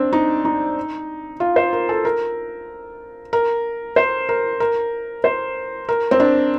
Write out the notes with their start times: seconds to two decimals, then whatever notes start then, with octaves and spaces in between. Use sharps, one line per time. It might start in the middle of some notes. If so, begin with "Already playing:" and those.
Already playing: C4 D4
0.13 D#4
0.45 D#4
1.40 F4
1.56 C5
1.73 A#4
1.89 A4
2.05 A#4
3.33 A#4
3.96 C5
4.29 A#4
4.60 A#4
5.24 C5
5.89 A#4
6.11 C4
6.20 D4